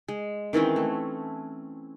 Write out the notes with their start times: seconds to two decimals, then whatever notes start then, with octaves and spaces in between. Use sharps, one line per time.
0.08 G#3
0.53 D#3 E3 C4 C#4
0.76 A3